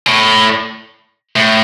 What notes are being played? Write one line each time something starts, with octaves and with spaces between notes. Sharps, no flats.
A2
A2